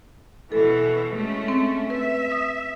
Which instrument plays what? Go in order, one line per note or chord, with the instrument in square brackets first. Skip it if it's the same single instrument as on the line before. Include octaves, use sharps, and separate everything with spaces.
[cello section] B2 E3 [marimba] A4
[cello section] G#3 A3 C#4
[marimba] C4
[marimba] B4 [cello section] E5
[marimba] D#6